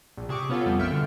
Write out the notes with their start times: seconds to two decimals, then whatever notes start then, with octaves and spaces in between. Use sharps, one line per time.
0.17 A#1
0.29 C3 G#4 C#6 D6
0.49 B3 C#4 F4 A4
0.66 F2 G3 B3
0.79 A#1 E5 G5 F6 C#7
0.90 B2 D3